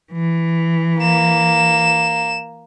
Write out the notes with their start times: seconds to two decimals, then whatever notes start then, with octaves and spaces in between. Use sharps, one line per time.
0.13 E3
1.00 A#3 E7